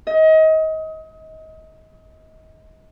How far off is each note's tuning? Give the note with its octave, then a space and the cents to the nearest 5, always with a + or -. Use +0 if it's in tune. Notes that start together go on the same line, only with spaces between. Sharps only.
D#5 +30